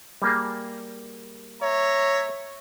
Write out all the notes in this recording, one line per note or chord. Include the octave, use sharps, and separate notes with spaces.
G3 A#3 G#4
C#5 E5 A#5